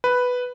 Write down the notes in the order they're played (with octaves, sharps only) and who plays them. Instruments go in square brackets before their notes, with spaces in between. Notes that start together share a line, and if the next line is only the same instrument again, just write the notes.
[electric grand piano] B4